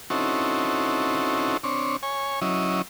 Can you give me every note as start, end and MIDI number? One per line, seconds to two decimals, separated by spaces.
0.10 1.57 60
0.10 1.57 61
0.10 1.57 63
0.10 1.57 64
0.10 1.57 66
0.10 1.57 69
1.63 1.97 60
1.63 1.97 62
1.63 1.97 73
2.03 2.40 73
2.03 2.40 80
2.42 2.82 54
2.42 2.82 61
2.42 2.82 64
2.42 2.82 75